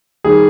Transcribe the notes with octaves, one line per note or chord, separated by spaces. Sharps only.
D#3 G3 G#4